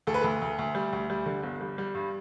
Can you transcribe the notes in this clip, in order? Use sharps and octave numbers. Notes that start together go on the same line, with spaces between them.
D2 A4
B4
D2 A4
D2
D2
G3
D2
G3
D3
G1
G3
G3
G2